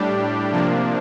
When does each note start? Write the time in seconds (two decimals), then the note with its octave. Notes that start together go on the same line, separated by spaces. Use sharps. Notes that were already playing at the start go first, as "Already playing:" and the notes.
Already playing: A2 G3 D4 G4
0.51 C3 F3 A#3 D4